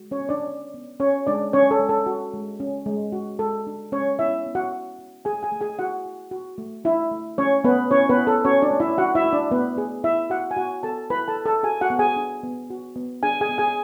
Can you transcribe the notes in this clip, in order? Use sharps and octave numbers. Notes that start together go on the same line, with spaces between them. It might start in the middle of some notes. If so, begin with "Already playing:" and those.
Already playing: G#3 F#4
C#4 C#5
B3
D4 D5
D4
B3
C#4 F#4 C#5
G#3 D4 D5
C#4 D4 C#5
A4
G#3
A4
F#4
G#3
C#4
G#3
F#4
G#3 A4
D4
G#3 C#4 C#5
B3 E4 E5
B3
F#4 F#5
F#4
F#4
A3 G#4 G#5
G#4 G#5
A3
G#4 G#5
E4 F#4 F#5
E4
F#4
A3
D4 E4 E5
A3
A3 C#4 C#5
A3 B3 B4
C#4 E4 C#5
B3 B4
E4
A4
C#4 F#4 C#5
D4 D5
A3
E4 E5
D4 F#4 F#5
E4 E5
A3
D4 D5
A3 B3 B4
A3 G#4
E4 E5
E4 F#4 F#5
G#5
B3 F#4 F#5
B3 A4 A5
E4 B4 B5
A4 A5
E4
A4 A5
F#4 G#4 G#5
F#4 F#5
B3
G#4 G#5
D4
B3
F#4
B3
D4 G#4 G#5
G#4 G#5
B3
G#4 G#5